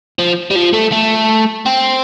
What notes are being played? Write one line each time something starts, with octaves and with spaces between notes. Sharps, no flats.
F3
G3
F3
A3
A3
C4